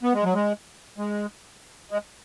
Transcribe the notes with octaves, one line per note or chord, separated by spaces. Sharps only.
B3
G#3
F#3
G#3
G#3
G#3